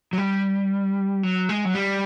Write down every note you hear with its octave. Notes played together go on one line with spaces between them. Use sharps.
F#3
G3
F#3
G#3
F#3
G3